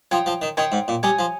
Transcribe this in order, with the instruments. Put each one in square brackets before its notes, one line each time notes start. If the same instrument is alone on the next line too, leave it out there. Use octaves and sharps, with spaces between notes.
[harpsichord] F3 [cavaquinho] C#5 G5 C6 D#6
[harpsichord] F3
D#3
[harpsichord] D#3 [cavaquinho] C#5 G5 C6 D#6
[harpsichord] G#2
A#2
[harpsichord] G3 [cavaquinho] C#5 G#5 D#6
[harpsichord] F3